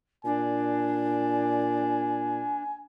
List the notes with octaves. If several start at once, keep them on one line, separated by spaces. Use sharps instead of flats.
A#2 D4 G#5